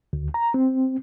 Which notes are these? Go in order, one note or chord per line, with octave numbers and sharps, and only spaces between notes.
D2
A#5
C4